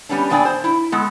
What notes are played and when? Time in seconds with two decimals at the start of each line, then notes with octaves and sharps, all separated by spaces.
0.09 G3 B3 C#4 D4
0.30 A#2 B3 D4 D5 G5 G#5
0.45 C5
0.64 E4
0.92 G#3 B3 A4